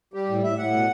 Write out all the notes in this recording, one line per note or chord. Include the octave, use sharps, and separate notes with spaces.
G3 G4
A2
A2 E5
A2 F#5
B2